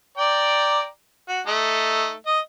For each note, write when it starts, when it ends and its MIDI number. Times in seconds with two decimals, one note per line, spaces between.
0.18 0.87 74
0.18 0.87 79
0.18 0.87 82
1.29 1.41 66
1.47 2.13 57
1.47 2.13 63
2.27 2.40 75